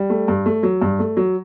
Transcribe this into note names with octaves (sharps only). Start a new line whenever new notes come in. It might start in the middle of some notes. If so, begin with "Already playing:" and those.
Already playing: G3
A3
G2
A3
F#3
G2
A3
F#3